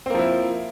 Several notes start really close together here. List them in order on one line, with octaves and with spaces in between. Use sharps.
C4 A#3 F3 E4